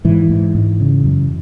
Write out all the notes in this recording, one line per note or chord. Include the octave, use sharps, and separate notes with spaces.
G#2 E3
G#2
G#2
C#3
F#2